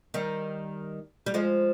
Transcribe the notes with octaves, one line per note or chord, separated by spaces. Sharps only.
D#3 G3
G3
F3 G#3